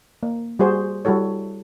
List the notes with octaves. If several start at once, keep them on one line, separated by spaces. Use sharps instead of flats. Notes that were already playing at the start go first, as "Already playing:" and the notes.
A#3
G3 F#4 G#4 C5
G3 E4 F#4 A4 C#5